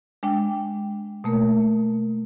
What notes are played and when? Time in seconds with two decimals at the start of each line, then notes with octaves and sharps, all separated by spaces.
0.23 G#3 D4 G5
1.24 B2 A3 A#3 A#4